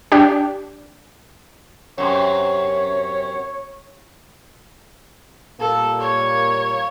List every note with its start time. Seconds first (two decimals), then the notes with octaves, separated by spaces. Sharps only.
0.12 D4 G4
1.98 F#2 C3 C#5
5.60 A#2 G3 A#3 A4
6.01 C#5